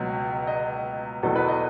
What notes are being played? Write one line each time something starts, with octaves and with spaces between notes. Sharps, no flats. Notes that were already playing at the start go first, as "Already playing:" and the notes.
Already playing: C#2 B2 F#3
D#5
E2 B2 F#3 A4
B4
D#5